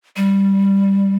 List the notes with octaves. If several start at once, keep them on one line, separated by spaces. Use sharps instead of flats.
G3